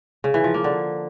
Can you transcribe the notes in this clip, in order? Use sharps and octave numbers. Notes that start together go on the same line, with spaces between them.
C#3
E3
F3
A#3
D3